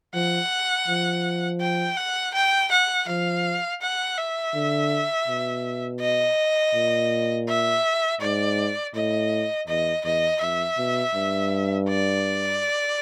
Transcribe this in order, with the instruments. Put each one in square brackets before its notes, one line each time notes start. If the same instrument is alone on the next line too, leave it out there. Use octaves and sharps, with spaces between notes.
[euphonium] F3 [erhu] F#5
[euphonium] F3
[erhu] G5
F#5
G5
F#5
[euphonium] F3 [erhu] F5
[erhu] F#5
E5
[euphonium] D3
B2
[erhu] D#5
[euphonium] A#2
[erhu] E5
[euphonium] G#2 [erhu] D5
[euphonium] A2 [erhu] D#5
[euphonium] E2 [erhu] D#5
[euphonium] E2 [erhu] D#5
[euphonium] F2 [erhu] E5
[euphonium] B2
G2
[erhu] D5